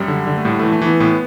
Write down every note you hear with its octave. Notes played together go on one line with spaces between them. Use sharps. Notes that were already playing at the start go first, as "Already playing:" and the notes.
Already playing: F#2 G3
D3
D3
A3
A2 G3
E3 A3
A3
E3 B3
A2 B3